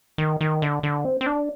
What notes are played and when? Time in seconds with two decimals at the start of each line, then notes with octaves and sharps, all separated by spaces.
0.18 D#3
0.41 D#3
0.62 D3
0.83 D3
1.05 C4
1.21 C4
1.26 D4